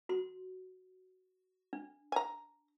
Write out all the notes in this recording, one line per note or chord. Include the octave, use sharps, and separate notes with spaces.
F#4 C6
D4
G#5 A#5